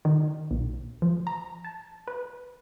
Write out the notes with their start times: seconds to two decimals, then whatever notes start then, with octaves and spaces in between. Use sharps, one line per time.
0.05 D#3
0.51 B1
1.02 F3
1.27 A#5
1.65 A5
2.08 B4